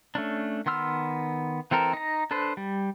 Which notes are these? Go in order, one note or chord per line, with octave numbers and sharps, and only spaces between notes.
A3 C#4 D4
D#3 B3 C6 E6 F6
E3 C4 A4 A#4
D#4 A#5
D4 A4 B4 C5
G3